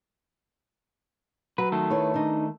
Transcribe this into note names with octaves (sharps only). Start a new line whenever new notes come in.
F#3 B4
D#3 A3 A4
E4 B4 C#5
D4 D#4